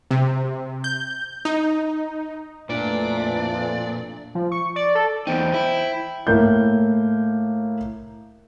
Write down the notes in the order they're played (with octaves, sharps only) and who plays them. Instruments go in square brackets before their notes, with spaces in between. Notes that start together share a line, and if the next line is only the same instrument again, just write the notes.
[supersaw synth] C3
G6
D#4
[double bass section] F2 A3 [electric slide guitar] A#2 [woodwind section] E3 D4 [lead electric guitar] D5
[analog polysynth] F3
C#6
D5
A4
[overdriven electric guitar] E2 D#4 [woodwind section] C5 G5
[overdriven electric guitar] E4
[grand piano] A2 A#3 G6